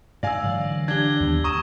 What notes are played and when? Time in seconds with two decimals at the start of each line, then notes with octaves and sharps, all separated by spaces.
0.23 G#2 D5 F5 G#5 E6 A#6
0.42 D3 E3 F#3
0.88 D4 G4 G#6 G7
1.20 D#2 G3 B3
1.44 D2 A#5 C#6 D#6 D#7 E7